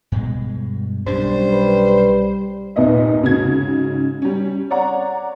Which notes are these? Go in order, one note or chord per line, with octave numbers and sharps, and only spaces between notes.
G2 B2 G#3
B1 G3 C#4 D4 C5
B4
D#2 A#2 B3 D#5 E5
G#2 C#3 F#4 G#6
G3 C#4
C#5 D5 F#5 A#5